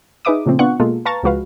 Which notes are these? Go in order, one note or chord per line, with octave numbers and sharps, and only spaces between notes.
D#4 G#4 B4 E5 D6 D#6
A#2 C#3 F3 A3 C4
B3 D4 F4 F#5 C#6 F#6
B2 G#3 A#3 F4 A4
B4 F5 A5 A#5 C#6 A6
C#2 F3 G#3 F#4 B4 F5